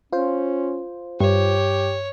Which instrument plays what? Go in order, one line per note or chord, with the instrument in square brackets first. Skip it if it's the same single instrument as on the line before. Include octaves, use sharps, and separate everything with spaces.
[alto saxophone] C#4 [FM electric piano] F4 C5
[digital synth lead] G2 [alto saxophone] G4 [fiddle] C#5